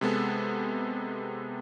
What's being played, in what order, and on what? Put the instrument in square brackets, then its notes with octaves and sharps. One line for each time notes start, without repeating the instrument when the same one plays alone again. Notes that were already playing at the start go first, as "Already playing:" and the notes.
[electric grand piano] C3 G#3 B3 A4